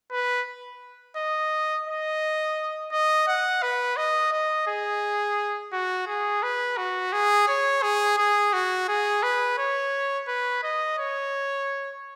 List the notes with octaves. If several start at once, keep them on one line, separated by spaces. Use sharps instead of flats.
B4
D#5
D#5
D#5
F#5
B4
D#5
D#5
G#4
F#4
G#4
B4
F#4
G#4
C#5
G#4
G#4
F#4
G#4
B4
C#5
B4
D#5
C#5